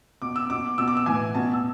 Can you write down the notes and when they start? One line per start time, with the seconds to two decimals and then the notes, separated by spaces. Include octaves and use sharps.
0.22 B2 D6
0.36 E6
0.50 B2 D6
0.78 B2 E6
0.88 D6
0.97 E6
1.06 A2 E3 G#5
1.35 B2 A5
1.54 E6